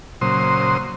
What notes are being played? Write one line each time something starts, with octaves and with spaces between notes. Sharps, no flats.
A#2 C#3 F#3 C5 C6 D#6